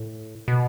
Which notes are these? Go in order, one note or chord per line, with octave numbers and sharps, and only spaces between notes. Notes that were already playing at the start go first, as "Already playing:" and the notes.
Already playing: A2
B2